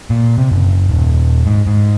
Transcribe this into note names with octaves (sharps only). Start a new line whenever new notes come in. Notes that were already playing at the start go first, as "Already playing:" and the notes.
A#2
C3
F#1
D#1
G#2
G#2